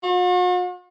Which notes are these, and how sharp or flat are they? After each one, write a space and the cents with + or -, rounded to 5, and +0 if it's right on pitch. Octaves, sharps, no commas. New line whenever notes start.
F#4 -45